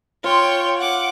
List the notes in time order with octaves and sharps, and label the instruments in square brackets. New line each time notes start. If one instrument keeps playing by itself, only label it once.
[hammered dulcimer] F4 [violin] C#5 G5
[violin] F#5 D6